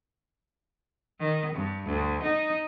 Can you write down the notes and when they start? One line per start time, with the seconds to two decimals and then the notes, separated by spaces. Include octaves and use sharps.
1.19 D#3
1.54 G2
1.86 D2
2.22 D#4